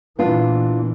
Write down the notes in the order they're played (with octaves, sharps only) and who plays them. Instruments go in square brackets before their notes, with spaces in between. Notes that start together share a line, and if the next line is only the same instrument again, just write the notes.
[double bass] A#2 E3 [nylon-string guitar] B3 D4 F4